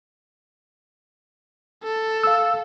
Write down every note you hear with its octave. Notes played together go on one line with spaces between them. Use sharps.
A4
F5 E6